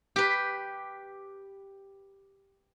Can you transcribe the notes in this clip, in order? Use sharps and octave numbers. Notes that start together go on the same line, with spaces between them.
G4 B4